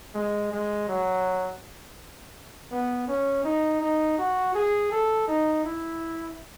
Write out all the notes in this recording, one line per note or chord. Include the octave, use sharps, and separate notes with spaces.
G#3
G#3
F#3
B3
C#4
D#4
D#4
F#4
G#4
A4
D#4
E4